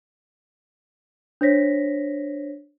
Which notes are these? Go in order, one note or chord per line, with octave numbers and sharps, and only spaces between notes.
D4 C5 C#5 A#6 B6